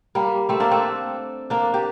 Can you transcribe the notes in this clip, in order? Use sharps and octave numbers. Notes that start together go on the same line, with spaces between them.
G3 A#3
A3 C4
A#3 D4
A3 C4
A#3 D4
G4